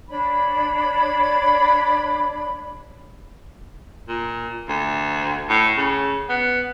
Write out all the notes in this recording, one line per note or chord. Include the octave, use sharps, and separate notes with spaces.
D4 C#5 B5
A#2
D2
A2
C#3
B3